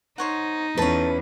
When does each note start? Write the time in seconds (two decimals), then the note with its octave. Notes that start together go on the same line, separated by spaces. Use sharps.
0.18 D#4 C5 C#5 F#5
0.77 E2 C#4 A4 B4 A5